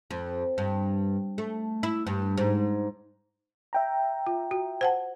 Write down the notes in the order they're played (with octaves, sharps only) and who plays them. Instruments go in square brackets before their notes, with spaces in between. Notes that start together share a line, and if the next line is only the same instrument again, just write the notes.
[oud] F2
G2
A3
E4
G2
G#2
[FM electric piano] E5 G5 A#5
[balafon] F4
F#4
C5 F#5 A5